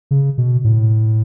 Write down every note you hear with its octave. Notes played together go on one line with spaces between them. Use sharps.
C#3
B2
A2